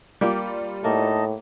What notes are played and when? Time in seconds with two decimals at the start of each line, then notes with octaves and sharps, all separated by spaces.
0.21 G3 A#3 F4 G4
0.84 A2 A#3 D#4 D#5 A5